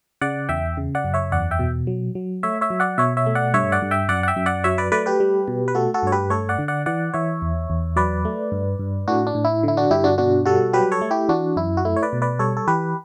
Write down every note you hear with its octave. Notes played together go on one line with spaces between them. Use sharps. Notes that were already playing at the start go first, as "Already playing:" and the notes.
C#3 D5 F#5
E2 E5 G5
C#3
D5 F#5
F#2
C#5 E5
E2 D5 F#5
E5 G5
B2
F#3
F#3
A3 C#5 E5
C#5 E5
F#3
D5 F#5
B2 C#5 E5
C#5 E5
A3
D5 F#5
G2 C#5 E5
D5 F#5
G2
E5 G5
F#2 D5 F#5
F#5
E5 G5
F#2
D5 F#5
F#3 C#5 E5
B4 D5
A3 B4 D5
G4 B4
G3
B2
B4
A3 F#4 A4
F#4 A4
G2 C#5
G4 B4
A3 A4 C#5
D5 F#5
D3
D5 F#5
E3 D5 F#5
E3 C#5 E5
E2
E2
F#3 B4 D5
A3
G2
G2
A2 D4 F#4
D4
A2
E4
D3 E4
D4 F#4
G2 E4 G4
D4 F#4
B2 D4 F#4
G3 F#4 A4
F#3 G4 B4
A4 C#5
A3
E4 G4
E3 D4 F#4
F#2 E4
F#4
A3 E4
C#5
B4 D5
B2
B4 D5
G3 A4 C#5
A4
E3 G4 B4